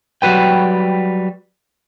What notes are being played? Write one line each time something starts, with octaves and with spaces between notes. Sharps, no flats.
F#3 G3 F#4 B4 G5